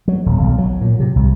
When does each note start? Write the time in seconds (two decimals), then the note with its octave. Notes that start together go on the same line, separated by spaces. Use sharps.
0.08 F#3
0.26 D#1
0.42 B1
0.58 F#3
0.81 A#2
1.00 C3
1.16 C2